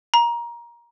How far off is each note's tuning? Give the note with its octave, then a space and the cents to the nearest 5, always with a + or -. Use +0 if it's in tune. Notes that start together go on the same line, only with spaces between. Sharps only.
A#5 +20